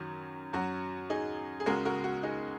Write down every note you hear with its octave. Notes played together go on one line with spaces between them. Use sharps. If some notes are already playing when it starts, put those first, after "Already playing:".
Already playing: F#2 D#3 F#3
F#2 F#3 F#4
D#4 G#4
G#4
C#2 C#3 G#3 F#4 A#4
F#4 A#4
F#4
D#4 G#4